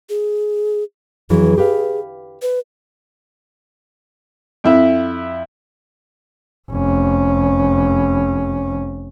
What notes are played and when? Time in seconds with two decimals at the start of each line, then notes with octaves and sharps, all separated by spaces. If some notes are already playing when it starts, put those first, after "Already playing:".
0.10 G#4
1.30 F2 E3 F#3 G#4
1.58 G4 B4 F5
2.42 B4
4.64 F2 E4 E5
6.71 F1 C#4